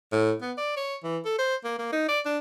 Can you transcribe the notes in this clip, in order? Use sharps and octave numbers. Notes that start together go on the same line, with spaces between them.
A2
B3
D5
C#5
E3
A4
C5
A#3
A#3
D#4
D5
D4